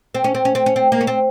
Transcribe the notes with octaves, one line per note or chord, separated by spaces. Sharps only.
C4
C#4
C4
C#4
C4
C#4
C4
A#3
C#4
C4